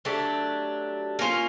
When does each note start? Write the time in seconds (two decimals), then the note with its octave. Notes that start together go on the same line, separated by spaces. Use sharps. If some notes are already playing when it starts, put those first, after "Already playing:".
0.05 F#3 A3 D4 G4
1.19 A#3 C#4 F4